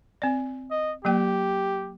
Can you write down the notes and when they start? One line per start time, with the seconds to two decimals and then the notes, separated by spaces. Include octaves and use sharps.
0.22 C4 D5
0.71 D#5
1.05 F#3 A#3 G4 G5